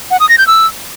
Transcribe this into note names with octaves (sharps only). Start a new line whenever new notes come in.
F#5
D#6
A#6
G6
E6